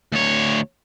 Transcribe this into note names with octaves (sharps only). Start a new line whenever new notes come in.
D2 C#5